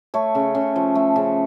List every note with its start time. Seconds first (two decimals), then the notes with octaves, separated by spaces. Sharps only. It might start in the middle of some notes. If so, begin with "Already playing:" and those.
0.14 A3 C#5
0.35 C#3
0.55 C#3
0.76 F3
0.95 A3
1.16 C#3